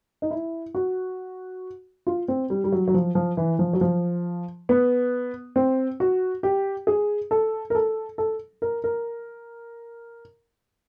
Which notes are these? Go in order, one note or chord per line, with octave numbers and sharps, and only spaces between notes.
D#4
E4
F#4
F4
C4
G3
G3
F#3
F#3
F3
F3
E3
F3
F#3
F3
B3
C4
F#4
G4
G#4
A4
A#4
A4
A4
A#4
A#4